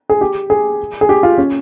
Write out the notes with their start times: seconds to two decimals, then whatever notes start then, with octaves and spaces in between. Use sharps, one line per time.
0.10 G#4
0.21 G4
0.50 G#4
1.01 G#4
1.09 G4
1.23 F4
1.38 C#4